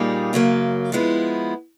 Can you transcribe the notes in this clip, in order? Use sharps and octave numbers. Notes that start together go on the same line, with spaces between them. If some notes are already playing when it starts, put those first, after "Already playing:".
Already playing: A#2 G3 A#3 D#4 G#4
F#2 C#3 F#3 A#3
F3 G#3 B3 E4